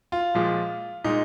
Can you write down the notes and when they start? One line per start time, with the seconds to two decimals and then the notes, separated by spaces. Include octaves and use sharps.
0.12 F4
0.35 A#2 F3 G#3
1.04 A#2 G#3 D#4